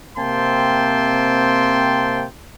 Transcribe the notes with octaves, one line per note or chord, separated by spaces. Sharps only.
C3 A#3 C4 G5 A5 C6